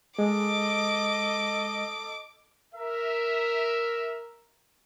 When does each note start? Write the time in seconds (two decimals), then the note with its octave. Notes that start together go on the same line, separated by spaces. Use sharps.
0.19 G#3 A4 D#5 D6
2.74 A#4 E5